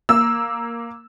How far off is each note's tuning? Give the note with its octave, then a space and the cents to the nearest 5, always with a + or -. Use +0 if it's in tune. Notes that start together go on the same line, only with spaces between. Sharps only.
A#3 +0 E6 +0